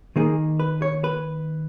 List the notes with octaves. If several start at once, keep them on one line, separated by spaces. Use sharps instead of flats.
D#3 A#3 D#4 G#4
B4
C#5
B4